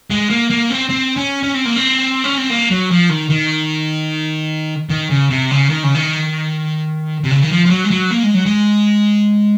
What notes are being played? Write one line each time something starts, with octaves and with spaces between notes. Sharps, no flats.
G#3
A#3
A#3
C4
C4
C#4
C#4
C4
A#3
C4
C#4
C4
A#3
F#3
F3
D#3
D#3
D#3
C#3
C3
C#3
D#3
C#3
D#3
C3
C#3
D#3
F3
F3
F#3
G#3
F#3
A#3
G#3
F#3
G#3